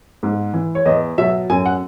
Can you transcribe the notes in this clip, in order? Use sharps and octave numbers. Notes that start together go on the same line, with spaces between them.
G#2
E3
C#5
E2 D#5
B2 F#3 E5
F#2 G#5
F#5